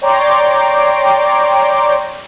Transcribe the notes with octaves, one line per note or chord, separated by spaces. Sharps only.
C#5 D5 G5 A#5 C6 D6